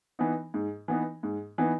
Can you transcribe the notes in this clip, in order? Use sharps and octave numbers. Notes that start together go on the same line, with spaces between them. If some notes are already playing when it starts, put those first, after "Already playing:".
E3 B3 D#4
G#2
E3 B3 D#4
G#2
E3 B3 D#4